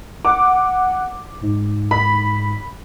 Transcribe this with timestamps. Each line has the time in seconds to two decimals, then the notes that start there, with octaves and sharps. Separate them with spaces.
0.25 F#5 D6
1.41 G#2
1.91 B5